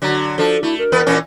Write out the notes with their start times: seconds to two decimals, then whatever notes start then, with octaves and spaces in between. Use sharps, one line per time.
0.02 D3 F#3
0.38 F3 D4 A4
0.63 A3 E4
0.79 A#4
0.92 E2 B3 B4
1.07 A#2 E3 C#4